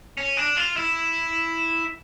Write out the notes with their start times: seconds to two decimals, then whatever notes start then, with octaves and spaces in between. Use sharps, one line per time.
0.17 C#4
0.37 D4
0.57 F4
0.76 E4